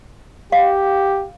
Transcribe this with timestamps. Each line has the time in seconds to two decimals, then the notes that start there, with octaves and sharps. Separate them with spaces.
0.52 G4 F5